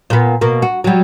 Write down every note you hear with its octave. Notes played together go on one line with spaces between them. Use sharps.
A#2 B3
B2 A#3
F#4
F#3 G3